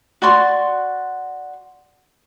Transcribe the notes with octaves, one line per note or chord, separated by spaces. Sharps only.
F#4 D5 C6 C#6